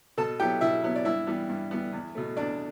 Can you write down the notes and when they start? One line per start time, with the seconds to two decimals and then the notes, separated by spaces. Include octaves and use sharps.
0.18 B2 A4 A5
0.40 F#3 B3 E4 G4 G5
0.61 B2 E4 E5
0.83 F#3 B3 E4
0.96 D5
1.05 G2 E4 E5
1.27 E3 G3 B3
1.49 G2
1.71 E3 G3 B3
1.92 E2
2.15 B2 A3
2.37 E2 D4 D5